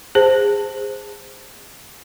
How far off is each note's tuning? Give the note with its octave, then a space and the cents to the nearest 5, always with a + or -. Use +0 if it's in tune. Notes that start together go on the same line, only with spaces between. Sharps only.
G#4 -20 C5 +0 A5 +15